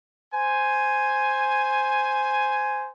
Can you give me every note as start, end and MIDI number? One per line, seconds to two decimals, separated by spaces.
0.33 2.90 72
0.33 2.90 80